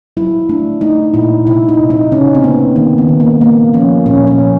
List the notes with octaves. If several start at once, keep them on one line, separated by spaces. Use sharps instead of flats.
F#3 E4
A3 D4
A3 D#4
A#2 E4
C3 E4
D#4
C3
D#4
C#3 C#4
C4
A#3 B3
D#3 A#3
B3
D#3
A#3
G#3 A#3
F3 C#4
A#2 C#4
C#4
F3